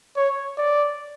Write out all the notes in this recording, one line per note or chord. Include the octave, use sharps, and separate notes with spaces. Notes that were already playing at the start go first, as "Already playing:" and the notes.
C#5
D5